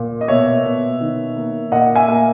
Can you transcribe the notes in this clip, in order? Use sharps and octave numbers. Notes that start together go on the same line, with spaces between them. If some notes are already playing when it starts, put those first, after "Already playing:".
Already playing: A#2
D#5
B2 C#5 E5
B2
D#3
A#3
A#2 D#5 F#5
E5 G#5
A#3